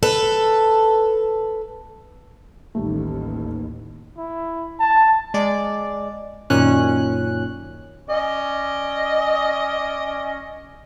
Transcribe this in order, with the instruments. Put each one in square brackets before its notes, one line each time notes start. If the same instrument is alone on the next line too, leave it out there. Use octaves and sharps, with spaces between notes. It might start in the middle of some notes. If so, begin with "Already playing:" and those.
[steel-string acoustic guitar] A4 B4
[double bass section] A1 D#2 [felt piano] D#3 G3 A3
[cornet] E4
A5
[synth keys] G#3 D5
F#2 A#2 D#3 C#4 F#6
[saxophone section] C#4 D5 D#5